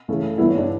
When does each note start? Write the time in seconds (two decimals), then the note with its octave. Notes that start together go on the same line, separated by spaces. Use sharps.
0.08 C#3 E3 A3
0.38 G2 E3 G3 B3 E4
0.48 C#4
0.57 D4